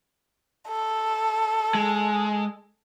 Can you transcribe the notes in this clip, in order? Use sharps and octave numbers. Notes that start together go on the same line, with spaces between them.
A4
G#3